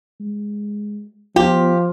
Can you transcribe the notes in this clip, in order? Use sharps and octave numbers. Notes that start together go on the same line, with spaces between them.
G#3
F3 B3 F4 G4